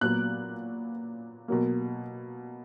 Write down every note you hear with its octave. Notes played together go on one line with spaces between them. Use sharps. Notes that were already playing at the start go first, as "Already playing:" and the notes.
A#2 F#3 B3 F#6
B2 F#3 A#3